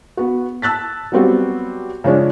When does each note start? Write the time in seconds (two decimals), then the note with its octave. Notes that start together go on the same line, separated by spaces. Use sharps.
0.17 B3 F#4
0.62 A5 E6 F#6 A6 B6
1.12 F#3 G3 B3 C4 F#4 G4
2.04 C#3 F3 G#3 C#4 D4